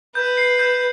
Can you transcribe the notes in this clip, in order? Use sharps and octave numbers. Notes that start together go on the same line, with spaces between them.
B4 G6
C7
G6